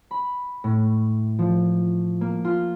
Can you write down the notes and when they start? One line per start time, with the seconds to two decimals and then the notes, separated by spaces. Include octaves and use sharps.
0.11 B5
0.64 A2
1.39 F3
2.21 A#3
2.45 F4